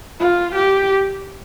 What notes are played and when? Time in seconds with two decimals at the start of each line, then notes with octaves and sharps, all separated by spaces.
0.20 F4
0.56 G4